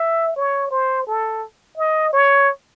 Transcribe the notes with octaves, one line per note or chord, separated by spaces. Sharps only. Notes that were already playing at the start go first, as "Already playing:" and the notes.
Already playing: E5
C#5
C5
A4
D#5
C#5